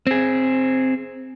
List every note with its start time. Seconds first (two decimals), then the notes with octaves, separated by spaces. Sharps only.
0.07 C4 G#4